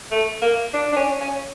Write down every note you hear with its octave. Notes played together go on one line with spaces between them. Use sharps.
A3
A#3
D4
D4
C#4
C#4